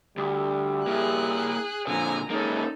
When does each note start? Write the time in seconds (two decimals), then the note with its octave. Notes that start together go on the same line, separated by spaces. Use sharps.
0.17 D2 G3
0.87 A#3 E4 G#4 F#6
1.88 A#2 D3 F3 G#5 A#5
2.30 G#3 A#3 C#4 D#4 A4